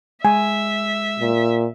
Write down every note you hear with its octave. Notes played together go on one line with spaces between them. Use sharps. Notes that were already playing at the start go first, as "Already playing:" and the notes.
G#3 E5 G#5
A#2